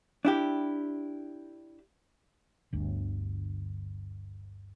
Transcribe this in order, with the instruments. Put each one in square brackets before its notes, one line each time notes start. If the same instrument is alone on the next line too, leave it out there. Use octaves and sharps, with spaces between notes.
[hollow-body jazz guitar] D4 E4 G4
[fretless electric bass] G1 D2 G2